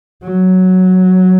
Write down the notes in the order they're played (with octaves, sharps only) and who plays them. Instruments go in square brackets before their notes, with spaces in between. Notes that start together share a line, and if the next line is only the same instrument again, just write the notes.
[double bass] F#3